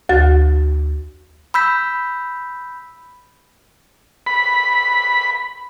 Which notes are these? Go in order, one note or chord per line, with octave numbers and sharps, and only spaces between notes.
D2 F#4 A6
B5 E6 G6 B6
B5